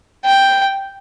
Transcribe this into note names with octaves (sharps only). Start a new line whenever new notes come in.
G5